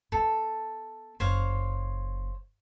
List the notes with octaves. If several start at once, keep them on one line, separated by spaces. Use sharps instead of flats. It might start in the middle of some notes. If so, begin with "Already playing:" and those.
B3 A4
F#1 C5 C#5 F5